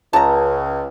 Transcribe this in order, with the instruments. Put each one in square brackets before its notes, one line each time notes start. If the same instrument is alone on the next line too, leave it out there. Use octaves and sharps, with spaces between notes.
[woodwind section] C#2 [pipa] A5 A#5